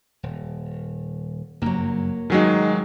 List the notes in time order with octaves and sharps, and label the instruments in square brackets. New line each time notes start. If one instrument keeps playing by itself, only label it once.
[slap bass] D#1
[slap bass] F#1 G2 [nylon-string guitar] F#3 A#3
[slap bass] G#2 [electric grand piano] D#3 F#3 G#3 [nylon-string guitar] D#4 F#4 G#4